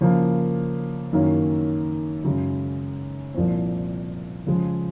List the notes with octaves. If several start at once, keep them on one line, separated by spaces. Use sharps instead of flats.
C#3 F3 A#3
F#2 D#3 A#3 C#4
F#2 C#3 G#3
C2 A#2 F3 C4
C#3 F3 G#3